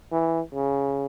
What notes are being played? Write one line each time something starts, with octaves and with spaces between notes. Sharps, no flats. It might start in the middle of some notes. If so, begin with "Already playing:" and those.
E3
C#3